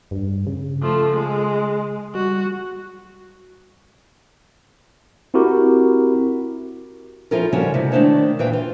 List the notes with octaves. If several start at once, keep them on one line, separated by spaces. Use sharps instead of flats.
G2
C#3
F3 A3
G#3
G3 F#4
C4 E4 F#4 G4 A#4
F3 C#4 E4 F4 A4 A#4
C#3 F3 G3 C#4 E4 F#4
C3 G#3 E4
D#3 G#3 A3 D4 C5 C#5
A#2 E3 B4 C5 F5 G5
F4